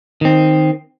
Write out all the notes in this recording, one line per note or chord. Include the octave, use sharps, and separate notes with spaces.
D#3 C4